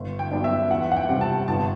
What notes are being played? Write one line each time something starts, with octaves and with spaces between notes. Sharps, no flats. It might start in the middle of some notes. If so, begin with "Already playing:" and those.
Already playing: G1
G5
G2 F#3 B3 D4
E5
E2 F#5
F#5
G5
C3 G3 C4
A5
G1 A5